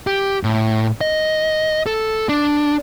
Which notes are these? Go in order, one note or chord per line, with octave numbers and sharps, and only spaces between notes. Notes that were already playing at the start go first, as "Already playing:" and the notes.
G4
A2
D#5
A4
D4